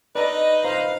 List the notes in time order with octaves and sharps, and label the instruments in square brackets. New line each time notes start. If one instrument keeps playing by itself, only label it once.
[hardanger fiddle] D#4 D#5 [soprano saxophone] B4 [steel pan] D5 A#5
[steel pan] C5 A#5 [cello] F5